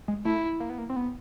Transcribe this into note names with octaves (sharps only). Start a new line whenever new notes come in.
G#3
A3 E4
A#3
B3
A#3
C4
B3